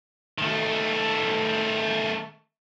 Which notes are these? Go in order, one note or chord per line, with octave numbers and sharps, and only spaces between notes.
D#3 A3